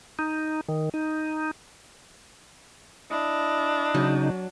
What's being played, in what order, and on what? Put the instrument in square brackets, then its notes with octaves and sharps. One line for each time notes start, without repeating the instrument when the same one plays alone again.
[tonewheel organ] D#4
D#3
D#4
[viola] D4 [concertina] E4 D#5
[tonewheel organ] C#3 D#4 [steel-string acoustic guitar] F#3